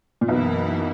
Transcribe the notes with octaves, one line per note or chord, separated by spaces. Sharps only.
A#2
B1 F#2 B2 E3 A#3 E4